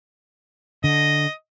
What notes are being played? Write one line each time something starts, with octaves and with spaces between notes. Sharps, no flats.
D3 D#5